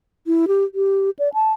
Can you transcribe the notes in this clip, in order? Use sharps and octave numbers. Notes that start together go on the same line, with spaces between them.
E4
G4
G4
D5
A5